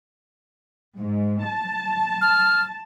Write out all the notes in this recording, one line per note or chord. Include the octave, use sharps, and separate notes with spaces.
G#2
A5
F6